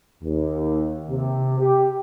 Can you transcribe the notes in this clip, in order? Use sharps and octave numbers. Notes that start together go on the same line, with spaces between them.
D#2
C3
G4